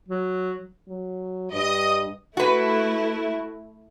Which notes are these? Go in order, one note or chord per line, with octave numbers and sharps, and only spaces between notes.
F#3
F#3
G2 D#5 D#6
A3 E4 F#4 B4